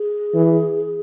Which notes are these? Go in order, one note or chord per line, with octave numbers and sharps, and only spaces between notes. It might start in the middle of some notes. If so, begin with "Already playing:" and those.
Already playing: G#4
E3